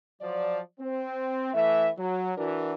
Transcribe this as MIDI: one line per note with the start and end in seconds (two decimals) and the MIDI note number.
0.22 0.60 53
0.22 0.60 54
0.22 0.60 74
0.80 1.53 60
1.54 1.89 52
1.54 1.89 57
1.54 1.89 76
1.98 2.32 54
2.37 2.74 52
2.37 2.74 62
2.37 2.74 66
2.37 2.74 70